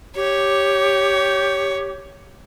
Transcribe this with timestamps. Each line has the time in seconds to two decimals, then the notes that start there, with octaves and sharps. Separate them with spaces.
0.16 G4 C#5